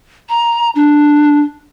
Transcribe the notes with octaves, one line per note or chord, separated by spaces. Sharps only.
A#5
D4